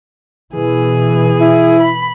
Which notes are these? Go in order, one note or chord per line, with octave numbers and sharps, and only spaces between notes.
B2 E3 G#4
E4
B5